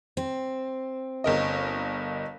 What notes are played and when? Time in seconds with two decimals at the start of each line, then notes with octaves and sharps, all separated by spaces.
0.17 C4
1.24 G1 A#4 D#5